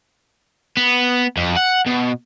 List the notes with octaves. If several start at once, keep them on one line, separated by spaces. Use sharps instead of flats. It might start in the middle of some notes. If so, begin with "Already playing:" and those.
B3
F2
F#5
B2